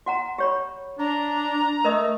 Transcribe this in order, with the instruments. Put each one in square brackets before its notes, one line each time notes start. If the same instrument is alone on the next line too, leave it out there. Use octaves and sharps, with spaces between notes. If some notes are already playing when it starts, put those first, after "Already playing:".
[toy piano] F#4 F#5 A#5
G4 C#5 B5
[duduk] D4 [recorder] A#5
[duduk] A3 [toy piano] A#4 D#5 D#6